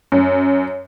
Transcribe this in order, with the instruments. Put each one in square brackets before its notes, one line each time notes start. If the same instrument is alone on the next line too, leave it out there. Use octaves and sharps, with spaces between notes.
[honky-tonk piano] F#2